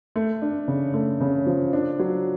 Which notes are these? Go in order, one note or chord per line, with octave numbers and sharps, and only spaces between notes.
A3
D4
C#3
A3
C#3
F3
D4
F#3